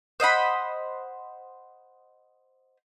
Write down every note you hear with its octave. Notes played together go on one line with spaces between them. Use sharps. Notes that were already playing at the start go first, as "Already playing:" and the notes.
C5 D#5 F#5 B5